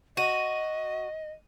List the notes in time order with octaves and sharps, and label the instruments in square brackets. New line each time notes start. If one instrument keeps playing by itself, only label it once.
[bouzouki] F#4 [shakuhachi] D#5 [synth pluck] D#7